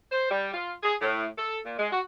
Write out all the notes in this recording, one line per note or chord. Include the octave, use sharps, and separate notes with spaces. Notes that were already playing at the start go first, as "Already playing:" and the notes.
C5
G3
F4
G#4
A2
A4
A#2
G#3
F#4